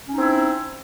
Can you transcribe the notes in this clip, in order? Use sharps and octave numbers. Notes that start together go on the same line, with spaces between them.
C4 C#4 D#4 E4